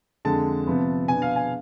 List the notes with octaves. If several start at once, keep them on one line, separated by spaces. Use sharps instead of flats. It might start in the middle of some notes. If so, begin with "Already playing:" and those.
F2 D3 G#3 A5
C3 F3 B3
B2 B3 D4 G#5
F5
G#5